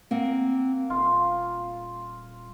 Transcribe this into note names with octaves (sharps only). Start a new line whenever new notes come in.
A#3 C4 F#5
D#1 F4